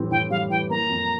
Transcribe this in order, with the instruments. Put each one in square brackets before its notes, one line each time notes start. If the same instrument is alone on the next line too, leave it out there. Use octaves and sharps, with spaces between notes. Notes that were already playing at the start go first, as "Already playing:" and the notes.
Already playing: [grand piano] A2 E3 G3 C4
[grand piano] A2 [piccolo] G5
[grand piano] G3 [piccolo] F5
[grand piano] E3 [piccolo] G5
[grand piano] A#3 [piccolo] A#5
[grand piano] F2